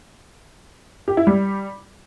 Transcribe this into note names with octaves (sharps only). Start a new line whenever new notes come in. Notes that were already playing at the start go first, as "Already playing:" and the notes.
G4
E4
G3